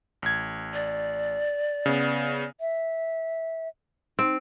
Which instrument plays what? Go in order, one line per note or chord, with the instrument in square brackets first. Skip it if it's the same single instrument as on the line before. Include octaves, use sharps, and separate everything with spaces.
[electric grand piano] A1 G#6
[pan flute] D5
[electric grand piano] C#3 B3
[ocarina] E5
[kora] C4 [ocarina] D#4